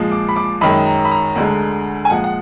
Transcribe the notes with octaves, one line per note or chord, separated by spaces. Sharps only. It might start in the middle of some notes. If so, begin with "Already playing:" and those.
Already playing: A#2 F3 G#3
D6
B5
D6
F#2 D#3 G#3 B5
A#5
B5
A#5
D2 D3 G#3
G#5
A#2 F3 G#3 F#5
F#5